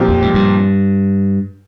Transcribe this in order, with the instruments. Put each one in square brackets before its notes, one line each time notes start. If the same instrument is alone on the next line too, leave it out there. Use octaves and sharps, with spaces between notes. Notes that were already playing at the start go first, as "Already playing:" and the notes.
Already playing: [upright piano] A#2 F3 C4 G4
[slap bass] F2
G#2
G2